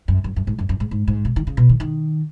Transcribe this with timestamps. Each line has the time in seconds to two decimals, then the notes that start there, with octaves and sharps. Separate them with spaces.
0.08 F#2
0.24 F#2
0.36 F#2
0.47 G#2
0.58 F#2
0.69 F#2
0.80 G#2
0.91 G#2
1.07 G#2
1.25 B2
1.36 D#3
1.47 C#3
1.57 B2
1.69 D#3
1.80 D#3